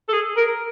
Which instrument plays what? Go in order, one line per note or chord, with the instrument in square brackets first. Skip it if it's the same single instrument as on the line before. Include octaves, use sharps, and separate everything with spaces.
[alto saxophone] A4
G#4
A#4